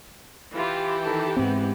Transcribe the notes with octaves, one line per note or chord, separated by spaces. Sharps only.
E3 F4 G4
D#3 A4
G#2 G#3 B3 C4